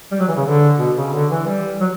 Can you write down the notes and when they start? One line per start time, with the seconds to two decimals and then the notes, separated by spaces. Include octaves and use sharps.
0.12 G3
0.20 F#3
0.28 E3
0.37 C#3
0.46 D3
0.79 B2
0.97 C#3
1.13 D3
1.30 E3
1.47 G3
1.81 F#3